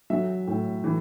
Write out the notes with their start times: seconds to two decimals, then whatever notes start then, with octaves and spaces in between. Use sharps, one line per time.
0.10 F#3 E5
0.47 A2
0.84 E3